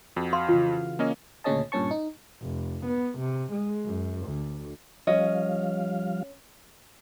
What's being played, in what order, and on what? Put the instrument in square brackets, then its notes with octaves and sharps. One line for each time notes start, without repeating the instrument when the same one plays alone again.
[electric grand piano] F2 [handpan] F#4
[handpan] F5 [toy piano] C6
[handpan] C#3 E3 [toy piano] F4
[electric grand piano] A#3 C#4 D#5
[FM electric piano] D2 A#2 C#3 C#4 D#5 A5
G2 A#2 C#4 A5 C#6
D#4
[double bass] F1
B3
C3
G#3
F#2
D2
[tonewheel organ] F3 G3 F5 [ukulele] C#4 D#5